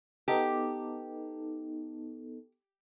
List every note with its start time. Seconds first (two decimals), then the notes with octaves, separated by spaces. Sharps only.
0.28 B3 D#4 G4 A4